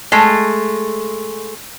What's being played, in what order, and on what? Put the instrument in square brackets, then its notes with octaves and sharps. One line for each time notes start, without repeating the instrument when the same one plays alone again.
[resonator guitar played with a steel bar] G#3 A3